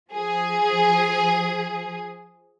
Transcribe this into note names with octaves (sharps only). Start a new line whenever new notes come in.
F3 G#4